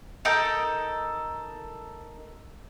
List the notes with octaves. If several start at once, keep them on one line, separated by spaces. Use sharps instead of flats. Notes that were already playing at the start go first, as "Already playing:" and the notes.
D#4 A4 A#4 G6